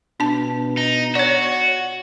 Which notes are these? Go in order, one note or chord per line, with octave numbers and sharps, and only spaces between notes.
B2 D4 A5
D#4
F#4 C#5 D5